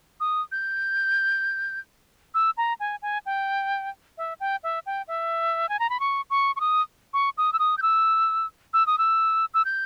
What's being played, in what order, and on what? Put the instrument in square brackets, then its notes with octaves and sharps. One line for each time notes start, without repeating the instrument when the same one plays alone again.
[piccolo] D#6
G6
E6
A#5
G#5
G#5
G5
E5
G5
E5
G5
E5
G#5
A#5
B5
C#6
C#6
C#6
D#6
C#6
D#6
E6
D#6
G6
E6
E6
D#6
E6
E6
G6